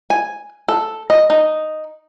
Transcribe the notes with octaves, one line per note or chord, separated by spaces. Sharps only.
G#5
A4
D#5
D#4